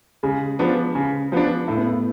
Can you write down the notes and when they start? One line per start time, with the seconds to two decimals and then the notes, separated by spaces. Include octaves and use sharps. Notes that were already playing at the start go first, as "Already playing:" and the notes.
0.23 C#3 G#3
0.59 F3 B3 D4
0.95 C#3
1.32 F3 B3 D4
1.67 A2 A3
1.77 B3
1.86 A3